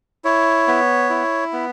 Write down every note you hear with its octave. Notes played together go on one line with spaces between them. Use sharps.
E4 C#5
B3
E4
B3